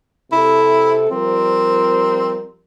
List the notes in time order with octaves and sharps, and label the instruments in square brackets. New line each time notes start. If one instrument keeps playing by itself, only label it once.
[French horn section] C3 A4 [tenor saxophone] E4
[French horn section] F3 G3 A#4 [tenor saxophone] C4